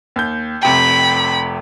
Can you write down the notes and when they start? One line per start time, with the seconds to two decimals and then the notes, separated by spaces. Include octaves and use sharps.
0.16 D#2 G6
0.63 F1 C3 G5 B5